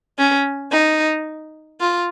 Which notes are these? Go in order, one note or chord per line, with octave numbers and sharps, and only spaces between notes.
C#4
D#4
F4